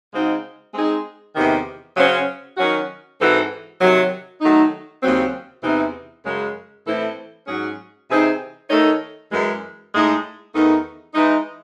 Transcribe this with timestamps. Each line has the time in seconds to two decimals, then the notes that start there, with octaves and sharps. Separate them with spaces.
0.12 C#3 G#3 C4 D#4 F#4
0.73 G#3 C4 D#4 G#4
1.35 E2 C3 D#3
1.96 C#3 F#3 C#4 F#4 C5
2.57 D#3 F#3 C#4 F#4
3.19 G#2 E3 C4 F#4 A4
3.80 C3 D#3 F#3
4.41 D#3 F#3 A3 D#4
5.03 D#2 C#3 F#3 C4
5.63 E2 C3 E3 C4 D#4
6.25 F#2 C#3 G#3
6.86 A2 E3 C4 E4 A4
7.47 G#2 F#3 C#4 G#4
8.08 C3 E3 C4 D#4 G#4
8.70 D#3 A3 D#4 A4 C#5
9.31 F#2 E3 G#3
9.93 A2 G#3 D#4 G#4
10.54 E2 D#3 A3 D#4
11.14 E3 G#3 D#4